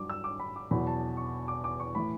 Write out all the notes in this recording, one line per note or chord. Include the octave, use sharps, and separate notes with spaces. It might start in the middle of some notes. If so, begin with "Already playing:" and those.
Already playing: G2 F#3 D6
E6
D6
B5
D6
E2 B2 F#3 B5
A5
C#6
D6
D6
C#6
A2 E3 B5